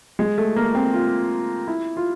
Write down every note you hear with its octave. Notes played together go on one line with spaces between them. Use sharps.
G#3
A3
A#3
C4
F4
E4
F4